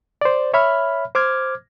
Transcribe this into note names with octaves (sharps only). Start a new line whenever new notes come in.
C5 D5
C#5 E5 B5 F6
C5 D6 F6 G#6